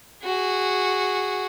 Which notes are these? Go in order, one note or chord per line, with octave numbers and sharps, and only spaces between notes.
F#4 G#4